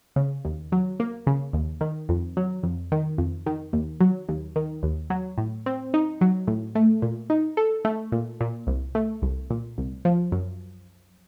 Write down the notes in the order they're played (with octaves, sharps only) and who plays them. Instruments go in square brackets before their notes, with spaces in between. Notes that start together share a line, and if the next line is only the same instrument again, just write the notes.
[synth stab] C#3
D#2
F#3
A#3
C#3
D#2
D#3
F2
F#3
F2
D#3
F2
D#3
D#2
F#3
D#2
D#3
D#2
F#3
A2
C4
D#4
F#3
A2
A3
A#2
D#4
A4
A3
A#2
A#2
C2
A3
C2
A#2
C2
F3
F#2